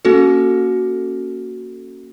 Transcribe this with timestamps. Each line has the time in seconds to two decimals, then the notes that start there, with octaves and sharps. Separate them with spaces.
0.05 A#3 C#4 F#4 A4